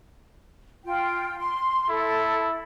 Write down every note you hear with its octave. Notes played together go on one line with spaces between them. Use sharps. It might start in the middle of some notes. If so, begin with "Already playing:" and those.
F4 G5
C6
E4 A4